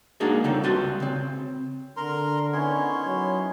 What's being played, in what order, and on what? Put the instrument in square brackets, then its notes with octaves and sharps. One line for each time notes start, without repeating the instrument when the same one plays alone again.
[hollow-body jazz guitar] G#3 A#3 D4 D#4 F#4 G#4
C#3 G3 C4 D#4 F4 A4
C#2 G3 F#4 B4 D5 C6
C#3 C4
[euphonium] D3 [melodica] A#4 A#5 C6
[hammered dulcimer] D#3 B3 C#4 [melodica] E4 C#5 C6
[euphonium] F#3